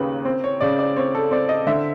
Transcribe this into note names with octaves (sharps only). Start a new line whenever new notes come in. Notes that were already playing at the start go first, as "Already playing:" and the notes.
Already playing: D#2 C#3 B4
C4
C#5
C#3 D5
D5
C4 C#5
A4
C4 D5
D#5
D3 E5